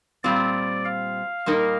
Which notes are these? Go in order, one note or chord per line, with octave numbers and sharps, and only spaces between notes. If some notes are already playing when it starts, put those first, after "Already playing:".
A#2 G3 C4 F4 D5
F5
A#2 G3 A#3 D#4 A#4